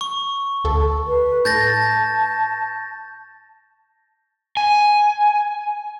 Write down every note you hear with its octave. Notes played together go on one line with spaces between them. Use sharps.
C#6
D2 A4
B4
A2 A5 G6 A6 A#6
G#5